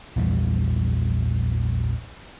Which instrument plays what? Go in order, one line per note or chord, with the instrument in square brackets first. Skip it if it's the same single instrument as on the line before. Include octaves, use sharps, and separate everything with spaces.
[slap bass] A#1 E2 G3